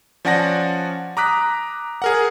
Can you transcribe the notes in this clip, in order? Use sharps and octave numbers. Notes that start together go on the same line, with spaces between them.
F3 C#4 D5 F#5 A5 A#6
A#5 D6 D#6 F#6 B6
G#4 A#4 F#5